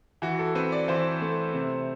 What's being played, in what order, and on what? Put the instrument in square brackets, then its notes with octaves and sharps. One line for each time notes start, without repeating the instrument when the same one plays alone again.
[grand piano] E3 F#4
A4
C4 B4
D5
E3 C5
A3
C3